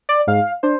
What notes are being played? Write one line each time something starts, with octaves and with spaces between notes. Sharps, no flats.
D5
G#2 F5
D4 C5